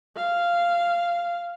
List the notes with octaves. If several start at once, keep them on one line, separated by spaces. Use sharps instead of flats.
F5